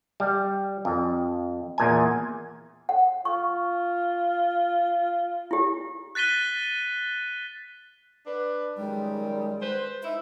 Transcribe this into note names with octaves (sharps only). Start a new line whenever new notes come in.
G3
F2
E2 A#2 G#5
F#5
F4 C#6
E4 G4
F#6 A6 B6 D#7 G7
D4 B4
F#2 D#3 G3 G#3
B4 C5
D#4 E4 E5